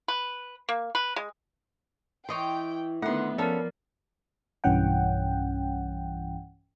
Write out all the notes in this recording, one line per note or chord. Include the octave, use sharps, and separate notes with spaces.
B4
A#3
B4
G#3
E3 C#5 D#5 G5 C6
D3 D#3 A3 B3 F#5 C6
F3 C#4 A4 A#4 D5 F5 B5
B1 G2 E3 C#4 F#5 G5